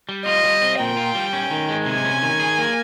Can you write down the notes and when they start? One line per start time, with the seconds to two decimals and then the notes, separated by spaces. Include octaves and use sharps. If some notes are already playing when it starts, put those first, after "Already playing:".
0.09 G3
0.26 F4 D#5
0.44 G3
0.62 C4
0.80 A#2 G5
0.97 F4
1.15 G3
1.33 C#4
1.51 D#3
1.69 G#3
1.86 C3 G#5
2.05 C#4
2.22 D#3
2.40 G#4
2.58 A#3